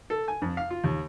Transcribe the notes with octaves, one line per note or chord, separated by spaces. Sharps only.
A4
G#5
F2
F5
F4
D#2